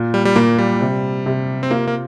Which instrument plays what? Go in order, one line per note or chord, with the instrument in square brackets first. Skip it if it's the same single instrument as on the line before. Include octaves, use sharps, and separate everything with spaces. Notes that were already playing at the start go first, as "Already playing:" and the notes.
Already playing: [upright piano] A#2
[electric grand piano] G3
G3
[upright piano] A#2 [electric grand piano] A#3
[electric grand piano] G3
[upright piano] C3
C3
[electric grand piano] C4
[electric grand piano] A#3 [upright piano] F4
[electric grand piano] A#3